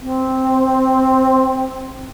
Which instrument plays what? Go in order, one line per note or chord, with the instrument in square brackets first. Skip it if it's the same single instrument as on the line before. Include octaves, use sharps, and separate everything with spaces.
[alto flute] C4